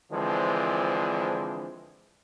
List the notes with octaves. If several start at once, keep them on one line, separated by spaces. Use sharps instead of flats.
D3 E3 F3 G#3 C4 D4